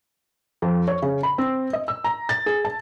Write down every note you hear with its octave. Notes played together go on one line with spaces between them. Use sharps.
F2
C#5
C#3
B5
C4
D#5
E6
A#5
A6
G#4
A5